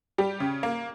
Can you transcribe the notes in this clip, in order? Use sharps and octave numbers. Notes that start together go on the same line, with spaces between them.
G3 G4
C#3
A#3